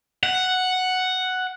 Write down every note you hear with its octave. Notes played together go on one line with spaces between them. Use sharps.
F#5